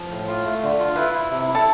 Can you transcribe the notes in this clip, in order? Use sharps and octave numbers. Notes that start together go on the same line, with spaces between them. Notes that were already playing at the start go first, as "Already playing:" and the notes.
Already playing: F3
A2
F4
A3
D3
F4
E4 B4
E4
C3
E4
A4